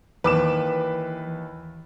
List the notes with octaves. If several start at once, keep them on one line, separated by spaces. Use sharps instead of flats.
D#2 E3 B4 D6 E7